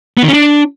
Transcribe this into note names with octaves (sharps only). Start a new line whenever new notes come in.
B3
D#3
C#4
D4